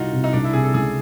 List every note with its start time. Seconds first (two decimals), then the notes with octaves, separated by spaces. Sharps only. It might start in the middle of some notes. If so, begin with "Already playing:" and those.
Already playing: C2 D#4 F4 F#4
0.13 C3
0.24 D#4
0.33 C2 D4
0.44 E4
0.53 C3 G#4
0.64 A4
0.74 C#2 G#4